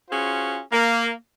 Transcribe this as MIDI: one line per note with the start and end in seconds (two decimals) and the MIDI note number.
0.10 0.59 61
0.10 0.59 65
0.10 0.59 66
0.10 0.59 68
0.10 0.59 72
0.71 1.10 58